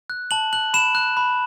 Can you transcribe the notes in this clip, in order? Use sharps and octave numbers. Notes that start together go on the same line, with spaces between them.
F#6
A5 F#7
F#6 F#7
B5 E7
F#6
B5